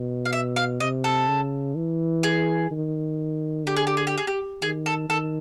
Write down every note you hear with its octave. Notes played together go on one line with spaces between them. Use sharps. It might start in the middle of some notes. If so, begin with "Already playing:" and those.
Already playing: B2
F5
E5
F5
C3 D#5
A4
C#3
E3
G#4
D#3
D3 G4
G#4
G4
G#4
G4
G#4
G4
D#3 G#4
A4
D#3 A4